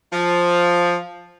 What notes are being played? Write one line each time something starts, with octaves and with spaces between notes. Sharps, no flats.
F3